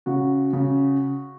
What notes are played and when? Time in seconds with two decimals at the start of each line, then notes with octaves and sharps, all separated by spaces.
0.06 C#3 F#4
0.53 C#3